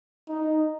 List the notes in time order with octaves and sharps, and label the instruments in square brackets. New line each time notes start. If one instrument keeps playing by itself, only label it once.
[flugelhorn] D#4